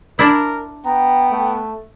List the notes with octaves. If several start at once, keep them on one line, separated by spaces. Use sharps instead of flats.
D4 E4 A#4
B3 G5 A#5
A3